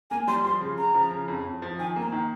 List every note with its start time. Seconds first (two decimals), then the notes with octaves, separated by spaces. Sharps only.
0.11 A#3 G#5
0.27 G3 C6
0.44 F3 C6
0.61 C#3
0.77 C#3 A#5
0.94 F3
1.11 C#3
1.28 F2
1.45 F2
1.62 F3
1.79 D#3 G#5
1.96 A#3
2.01 A#5
2.12 D#3